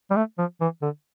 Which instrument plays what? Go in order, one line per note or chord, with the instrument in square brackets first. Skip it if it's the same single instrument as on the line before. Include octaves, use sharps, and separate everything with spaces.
[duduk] G3
A3
F3
E3
D3